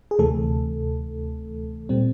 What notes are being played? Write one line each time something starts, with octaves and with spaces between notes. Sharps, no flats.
G#4
D2 C3 E3 A3 A4
A#2 G3 C4